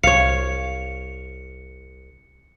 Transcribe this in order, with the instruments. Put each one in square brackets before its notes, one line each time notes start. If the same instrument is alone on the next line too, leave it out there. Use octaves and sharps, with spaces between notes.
[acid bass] C2 [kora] C#5 F5 [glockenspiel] C#7